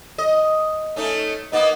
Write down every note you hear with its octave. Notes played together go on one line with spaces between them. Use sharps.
D#5
A3 C#4 D#4
A#3 B3 D#4 D#5